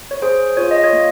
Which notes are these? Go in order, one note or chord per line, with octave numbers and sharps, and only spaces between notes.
C#5
G#4 C5
F4 C#5
D#5
C#5
A#3